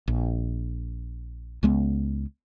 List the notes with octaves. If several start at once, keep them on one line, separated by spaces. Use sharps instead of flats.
A#1
C#2 G#3 B3